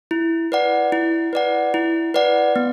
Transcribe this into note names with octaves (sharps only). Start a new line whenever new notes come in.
E4
B4 D5 F#5
E4
B4 D5 F#5
E4
B4 D5 F#5
B3